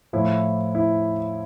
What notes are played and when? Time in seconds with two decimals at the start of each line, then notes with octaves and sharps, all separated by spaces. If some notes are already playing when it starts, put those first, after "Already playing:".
0.13 A2 F3 E4
0.75 E4